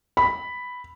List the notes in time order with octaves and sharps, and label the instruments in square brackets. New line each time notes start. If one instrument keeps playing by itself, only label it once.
[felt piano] B5